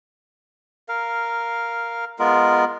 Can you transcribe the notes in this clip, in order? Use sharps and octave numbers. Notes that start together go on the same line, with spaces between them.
A#4 F5
G#3 B3 F4 A#4